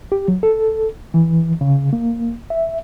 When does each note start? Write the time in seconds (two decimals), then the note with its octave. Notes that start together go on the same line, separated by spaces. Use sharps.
0.12 G4
0.28 F#3
0.43 A4
1.14 E3
1.61 C#3
1.93 A#3
2.50 E5